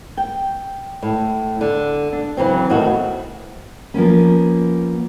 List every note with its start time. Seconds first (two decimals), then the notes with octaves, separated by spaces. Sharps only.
0.17 G5
1.02 A2
1.61 D3
2.13 D4
2.37 C#3 E3 F#3 C4
2.69 E2 A2 D#3 F#4
3.94 F3 A#3 B3 C#4